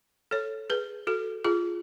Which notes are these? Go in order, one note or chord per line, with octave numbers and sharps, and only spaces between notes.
A4 C#5
G#4 B4
F#4 A4
F4 G#4